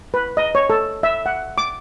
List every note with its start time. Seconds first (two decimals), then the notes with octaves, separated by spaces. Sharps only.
0.14 B4
0.37 D#5
0.55 C#5
0.70 A4
1.03 E5
1.26 F#5
1.58 D6